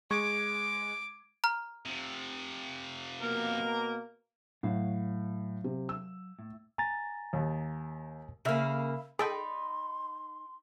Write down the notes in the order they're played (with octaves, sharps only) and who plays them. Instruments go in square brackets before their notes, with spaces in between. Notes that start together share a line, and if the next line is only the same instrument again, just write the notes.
[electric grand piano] G#3 C#6 G#6 [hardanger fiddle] D6
[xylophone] A#5 F6
[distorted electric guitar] C3 F3
[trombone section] B2 A#3 [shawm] A#4
[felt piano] A2 [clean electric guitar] F#3 F5
[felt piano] C3
E6
[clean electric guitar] A2
[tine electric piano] G#5 A#5 A6
[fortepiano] D#2
[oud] C#3 A#3 [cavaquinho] E5 F5 B5
[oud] D#4 D5 [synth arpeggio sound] G#4 A4 G5 [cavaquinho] B5 [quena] C6